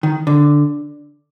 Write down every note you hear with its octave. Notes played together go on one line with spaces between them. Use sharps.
D#3
D3